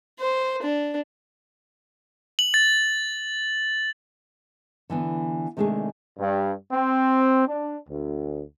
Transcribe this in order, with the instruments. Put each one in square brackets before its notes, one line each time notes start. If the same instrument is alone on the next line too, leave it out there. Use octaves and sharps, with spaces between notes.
[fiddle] C5
D4
[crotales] F#7
A6
[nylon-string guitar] D3 E3 B3
C3 D#3 G#3 A3 D4 G#4
[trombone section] G2
C4
D4
D2